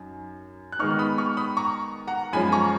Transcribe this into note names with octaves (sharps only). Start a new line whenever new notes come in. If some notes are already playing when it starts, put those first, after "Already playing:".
Already playing: F#2 D#4
F#6
D#3 G#3 B3 D#4 C#6 F6
F6
B5 D#6
C#6 F6
B5 D#6
A#5 C#6
F#5 A#5
F#2 F3 G#3 C#4 G#5 B5
A#5 C#6